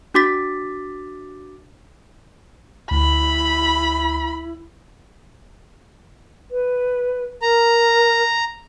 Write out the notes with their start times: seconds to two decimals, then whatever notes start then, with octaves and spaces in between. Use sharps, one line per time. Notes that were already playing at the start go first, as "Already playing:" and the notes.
0.14 D4 F#4 D6 A6 B6
2.91 D2 E4 B5
6.51 B4
7.42 A#4 A#5